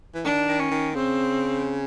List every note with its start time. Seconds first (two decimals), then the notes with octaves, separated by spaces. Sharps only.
0.15 E3
0.25 D#3 D4
0.48 D#3
0.60 C#4
0.71 D#3
0.95 C#3 C4